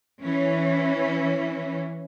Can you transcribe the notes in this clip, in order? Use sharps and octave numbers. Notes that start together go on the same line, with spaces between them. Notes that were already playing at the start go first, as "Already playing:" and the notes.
E3 C#4